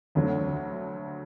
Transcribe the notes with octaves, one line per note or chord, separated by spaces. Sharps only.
D2 D3 F#3